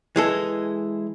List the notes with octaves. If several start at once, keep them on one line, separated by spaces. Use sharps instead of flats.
E3 G#3 A4